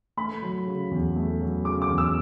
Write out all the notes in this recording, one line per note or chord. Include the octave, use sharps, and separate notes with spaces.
A3 B5
F#3
C#3
E2
A3
F#3
C#3 D6
D6
E2
E6